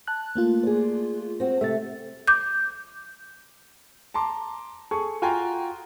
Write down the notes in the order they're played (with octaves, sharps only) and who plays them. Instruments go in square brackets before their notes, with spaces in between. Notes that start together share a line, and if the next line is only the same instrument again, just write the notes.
[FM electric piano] A5 F#6
A3 A#3 F4
[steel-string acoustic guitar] G#4 D5
C4 F#4
[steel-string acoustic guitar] C3 A3 [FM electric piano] E5 A6
[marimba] D6 G6
[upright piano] A5 A#5 C6 D6
G#4 A4 C#6
F4 F#4 G5 G#5 A#5 C6